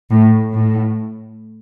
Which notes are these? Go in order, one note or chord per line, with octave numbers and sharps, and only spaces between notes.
A2
A2